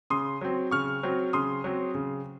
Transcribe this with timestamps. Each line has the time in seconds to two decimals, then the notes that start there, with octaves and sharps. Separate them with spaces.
0.10 C#3 C6 D#6
0.41 F#3 C4
0.71 C#3 C#6 F6
1.03 F#3 C4
1.33 C#3 C6 D#6
1.64 F#3 C4
1.95 C#3